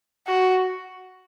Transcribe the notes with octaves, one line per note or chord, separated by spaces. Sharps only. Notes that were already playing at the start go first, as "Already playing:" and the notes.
F#4